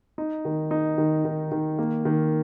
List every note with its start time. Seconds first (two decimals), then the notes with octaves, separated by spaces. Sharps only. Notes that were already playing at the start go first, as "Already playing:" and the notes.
0.18 D#4
0.45 D#3
0.71 D#4
0.98 D#3
1.25 D#3
1.52 D#3
1.79 A#3
2.05 D#3